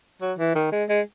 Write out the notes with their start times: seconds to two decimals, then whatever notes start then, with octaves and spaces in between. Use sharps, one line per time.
0.21 F#3
0.39 E3
0.55 D#3
0.72 G#3
0.89 G#3